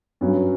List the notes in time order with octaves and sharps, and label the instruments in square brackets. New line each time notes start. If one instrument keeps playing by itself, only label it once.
[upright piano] G2 F#3 C#4